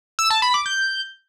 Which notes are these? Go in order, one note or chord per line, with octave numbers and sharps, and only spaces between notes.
E6
A5
B5
D6
G6